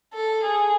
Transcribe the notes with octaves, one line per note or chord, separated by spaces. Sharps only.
A4
G#4